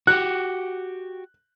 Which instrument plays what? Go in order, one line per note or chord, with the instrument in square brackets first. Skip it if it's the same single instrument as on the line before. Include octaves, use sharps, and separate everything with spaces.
[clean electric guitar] F#4 G4 [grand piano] F#6